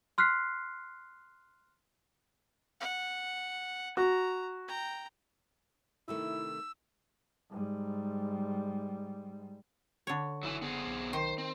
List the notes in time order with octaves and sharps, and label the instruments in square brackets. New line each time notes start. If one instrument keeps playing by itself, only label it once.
[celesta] C6 F6 F#6 B6 C7
[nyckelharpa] F#5
[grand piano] F#4 [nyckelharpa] A#5
[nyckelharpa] G5 A#5
[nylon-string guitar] C3 D#3 A3 [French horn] E4 [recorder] E6
[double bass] G#2 G3
[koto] D3 C#5
[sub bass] F#1 [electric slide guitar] F#3 E4 G#5
[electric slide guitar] B3 C4 G#4
[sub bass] B1
[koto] D#3 [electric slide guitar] C5
[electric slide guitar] C4